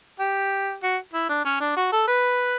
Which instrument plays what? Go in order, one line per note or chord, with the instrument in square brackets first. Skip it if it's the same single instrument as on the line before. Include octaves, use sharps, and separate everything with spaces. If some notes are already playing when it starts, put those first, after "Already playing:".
[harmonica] G4
F#4
E4
D4
C#4
D4
F#4
A4
B4